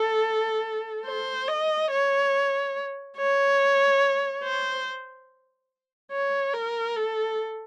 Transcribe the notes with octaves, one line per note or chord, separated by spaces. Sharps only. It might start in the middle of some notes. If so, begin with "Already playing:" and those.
Already playing: A4
C5
D#5
C#5
C#5
C5
C#5
A#4
A4